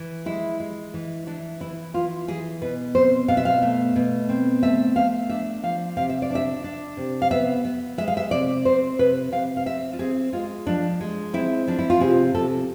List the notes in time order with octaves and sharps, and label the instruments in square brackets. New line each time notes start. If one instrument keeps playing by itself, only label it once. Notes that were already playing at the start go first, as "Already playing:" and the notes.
Already playing: [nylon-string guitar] E3
G#3 E4
G#3
E3
E3 D4
E3 E4
E3 F4
E3 G#4
B2 B4
C4 C5
B2 F5
E5
F5
A3
B2
C4
A3 E5
A3 F5
D4 E5
F3 F5
C3 F5
E5
D5
D4 E5
D4
C3
F5
B3 E5
B3
G#3 E5
F5
E5
C3 D5
C4 C5
C3 B4
C3 F5
F5
C4 E5
F4
C4 G#4
G#3 F4
F3 D4
G#3
C4 E4
F3 D4
E4
F4
C3 G#4
C3 A4